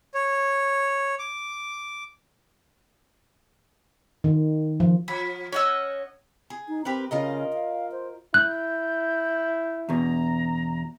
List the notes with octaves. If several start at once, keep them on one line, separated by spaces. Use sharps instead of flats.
C#5
D6
D#3
F3
F3 B5
C#4 C#5 D#5 F#5 E6
G#4
D#4
C4 G4 A#4 B4
C#3 F4 A#4 D#5
F5
C5
E4 F#6 G6
E2 B2 A#5